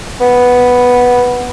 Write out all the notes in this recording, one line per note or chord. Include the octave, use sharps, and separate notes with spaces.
B3